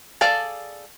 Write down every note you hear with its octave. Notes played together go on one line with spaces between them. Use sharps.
G#4 A4 D5 F5 A5